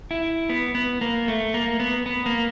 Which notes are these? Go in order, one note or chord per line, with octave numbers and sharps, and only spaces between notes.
E4
B3
B3
A#3
A3
A#3
B3
B3
A#3